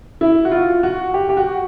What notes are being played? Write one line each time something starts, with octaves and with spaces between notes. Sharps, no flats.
E4
F#4
F4
F#4
G4
G4
F#4